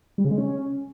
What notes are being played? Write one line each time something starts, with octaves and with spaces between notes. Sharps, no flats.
G3
C#3
G#3
C#4